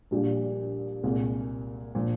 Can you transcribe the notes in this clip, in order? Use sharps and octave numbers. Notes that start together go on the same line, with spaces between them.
A#1 A#2 G3 D4 G4
C2 A#2 G#3
A#2 F3